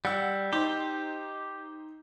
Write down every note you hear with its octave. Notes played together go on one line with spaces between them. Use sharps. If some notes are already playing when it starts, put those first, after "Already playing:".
G3 F#5 E6
D#4 G4 C5